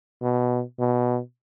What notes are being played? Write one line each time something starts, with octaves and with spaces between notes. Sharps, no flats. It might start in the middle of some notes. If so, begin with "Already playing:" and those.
B2
B2